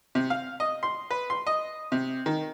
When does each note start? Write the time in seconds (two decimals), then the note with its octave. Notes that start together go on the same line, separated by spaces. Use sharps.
0.15 C3
0.30 F5
0.60 D#5
0.83 C6
1.10 B4
1.30 C6
1.47 D#5
1.92 C3
2.26 D#3